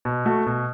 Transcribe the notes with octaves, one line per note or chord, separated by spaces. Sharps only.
B2
A3 F#4
B2